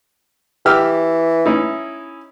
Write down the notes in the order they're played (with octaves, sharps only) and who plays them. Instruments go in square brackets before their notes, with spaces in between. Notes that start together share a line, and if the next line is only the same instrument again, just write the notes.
[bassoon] E3 [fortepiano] G4 E6 F6
[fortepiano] C#4 D#4 E4